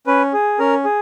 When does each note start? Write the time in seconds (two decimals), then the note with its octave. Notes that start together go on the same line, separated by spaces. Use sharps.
0.07 C#4 B4
0.33 G#4
0.59 C#4 A#4
0.84 G#4